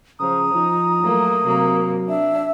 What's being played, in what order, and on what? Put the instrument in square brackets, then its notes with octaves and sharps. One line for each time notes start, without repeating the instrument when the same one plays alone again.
[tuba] C#3 [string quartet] F3 [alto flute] A#5 [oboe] D#6
[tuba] F3 [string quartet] D#4
[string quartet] F#3 A3 A#3
[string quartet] C3 A#3 [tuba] F#3
[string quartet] D4 [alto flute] E5